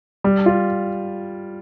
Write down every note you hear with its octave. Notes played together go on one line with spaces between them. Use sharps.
G3
F4